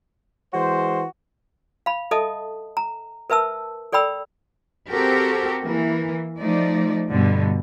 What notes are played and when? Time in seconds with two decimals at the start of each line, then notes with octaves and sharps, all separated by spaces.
0.53 E3 G#3 F#4 C5
1.86 F5 B5
2.11 A4 D#5 E5 A5 D#6
2.77 A#5
3.30 A#4 B4 E5 A5 E6
3.93 A4 D5 G5 B5 E6
4.90 C4 F#4 G4 A4 A#4
5.60 E3 A#3
6.39 F3 A3 D#4 D5
7.10 G2 B2 D3 G3